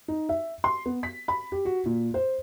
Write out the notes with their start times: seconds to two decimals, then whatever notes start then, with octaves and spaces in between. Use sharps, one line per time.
0.08 D#4
0.29 E5
0.64 C6
0.86 B3
1.03 B6
1.28 B5
1.52 G4
1.65 F#4
1.86 A#2
2.14 C5